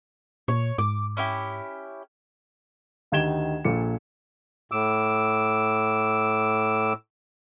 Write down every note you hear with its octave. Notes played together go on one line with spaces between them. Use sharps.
A#2 C#5
G#2 D6
C#4 E4 G4
D2 D#3 G4 G#6 E7 G7
A#1 A#2 A4 C#7
A2 D6 E6